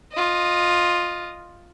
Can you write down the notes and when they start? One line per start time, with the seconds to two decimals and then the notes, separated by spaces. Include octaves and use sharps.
0.13 F4 D#5